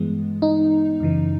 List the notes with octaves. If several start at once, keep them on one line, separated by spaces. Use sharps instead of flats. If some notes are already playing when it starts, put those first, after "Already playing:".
Already playing: G2 E3 G#3 B3
D#4
F#2 C#3 E3